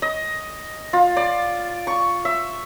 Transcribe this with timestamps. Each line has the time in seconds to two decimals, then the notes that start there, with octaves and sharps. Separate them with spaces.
0.02 D#5
0.93 F4
1.17 D5
1.87 C#6
2.25 E5